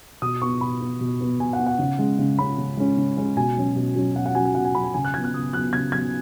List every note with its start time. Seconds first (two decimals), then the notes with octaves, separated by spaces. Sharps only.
0.22 B2 D#6
0.41 B3 C#6
0.61 B2 B5
0.81 B3
1.01 B2
1.21 B3
1.40 B2 G#5
1.53 F#5
1.59 B3
1.67 F#5
1.79 C#3
1.99 G#3 C#4
2.19 C#3
2.39 G#3 C#4 B5
2.58 C#3
2.77 G#3 C#4
2.97 C#3
3.17 G#3 C#4
3.37 B2 G#5
3.56 F#3 C#4
3.76 B2
3.96 F#3 C#4
4.15 B2 F#5
4.26 F#5
4.35 F#3 C#4 G#5
4.45 G#5
4.55 B2 F#5
4.65 G#5
4.74 F#3 C#4 B5
4.84 G#5
4.94 C#3 G#5
5.04 F#6
5.14 F#3 B3 G#6
5.24 F#6
5.33 C#3 D#6
5.53 F#3 B3 F#6
5.73 C#3 G#6
5.92 F#3 B3 G#6